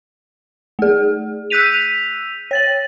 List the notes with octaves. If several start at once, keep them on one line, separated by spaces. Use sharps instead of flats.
A3 G#4
E6 F#6 G6 B6 D#7 F7
C#5 A6 F#7